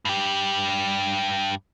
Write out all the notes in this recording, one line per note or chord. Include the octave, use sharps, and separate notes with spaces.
G2 G4